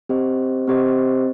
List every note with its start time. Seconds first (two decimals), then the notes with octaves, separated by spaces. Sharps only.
0.09 C4 G4 C5 D#5
0.67 C4 G4 C5 D#5